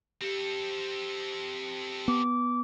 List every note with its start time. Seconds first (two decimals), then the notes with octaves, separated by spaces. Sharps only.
0.21 C4 G4 A4
2.08 B3 D6